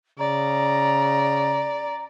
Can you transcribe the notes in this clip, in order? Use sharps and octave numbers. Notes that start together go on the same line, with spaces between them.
C#3 D5 A#5